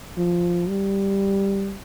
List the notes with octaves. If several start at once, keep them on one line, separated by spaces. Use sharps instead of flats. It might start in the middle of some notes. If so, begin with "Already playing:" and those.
F3
G3